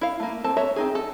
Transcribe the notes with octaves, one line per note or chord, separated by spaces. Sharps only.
E4 F5
A3 A#3
C4 A4 A5
F#4 A4 C#5 E5
C4 D#4 G#4
A4